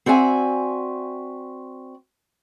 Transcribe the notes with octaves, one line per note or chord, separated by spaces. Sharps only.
C4 F#4 D5 E5 G#5